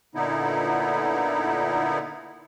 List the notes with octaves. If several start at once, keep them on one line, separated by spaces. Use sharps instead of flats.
A#2 D3 B3 D#4 E4